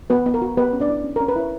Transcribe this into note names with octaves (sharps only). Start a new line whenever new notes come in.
B3 F#4 B4
B3
A#4
F#4
B3 G4 B4
C#4
D4 D5
E4
C#4
C#4 A#4
B4
E4 C#5